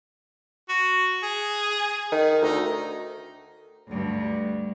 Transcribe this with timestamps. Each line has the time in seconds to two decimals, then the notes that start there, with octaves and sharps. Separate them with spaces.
0.69 F#4
1.23 G#4
2.12 D#3
2.42 D2 D#4
3.88 D2 G2